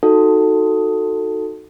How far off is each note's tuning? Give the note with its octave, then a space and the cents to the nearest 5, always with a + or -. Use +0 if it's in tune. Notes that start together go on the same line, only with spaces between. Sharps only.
D#4 +0 F#4 +0 A4 +10